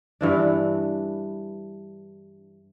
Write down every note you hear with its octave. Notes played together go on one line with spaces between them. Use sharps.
G2 E3 D4